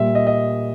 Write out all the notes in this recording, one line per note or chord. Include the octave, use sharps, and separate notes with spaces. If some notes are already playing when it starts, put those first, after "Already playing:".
Already playing: A#2 G3 E5
D#5
D#5